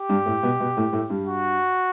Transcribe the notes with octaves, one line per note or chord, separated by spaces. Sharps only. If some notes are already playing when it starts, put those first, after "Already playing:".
Already playing: G4
G2 G3
A2 A3
B2 B3
B2 B3
A2 A3
A2 A3
G2 G3
F#4